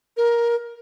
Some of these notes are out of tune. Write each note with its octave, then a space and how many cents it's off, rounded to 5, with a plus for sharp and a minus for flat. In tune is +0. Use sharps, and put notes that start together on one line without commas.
A#4 +15